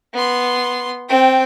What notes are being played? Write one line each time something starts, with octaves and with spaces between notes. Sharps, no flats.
B3 C6
C4 G5